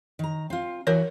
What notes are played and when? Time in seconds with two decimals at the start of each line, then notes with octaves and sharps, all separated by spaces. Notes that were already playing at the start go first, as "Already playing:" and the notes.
0.19 D#3 A#5
0.50 C4 F4
0.87 E3 F#4 A#4 C#5